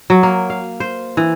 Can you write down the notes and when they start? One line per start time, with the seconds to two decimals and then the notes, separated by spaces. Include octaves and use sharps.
0.10 F#3
0.23 A#3
0.50 F5
0.80 C5
1.17 E3